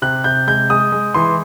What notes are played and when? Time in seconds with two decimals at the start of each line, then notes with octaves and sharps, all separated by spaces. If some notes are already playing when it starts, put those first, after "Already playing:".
0.02 C3 F#6
0.24 C3 G6
0.48 G#3 G6
0.70 G#3 D#6
0.92 G#3
1.14 E3 C6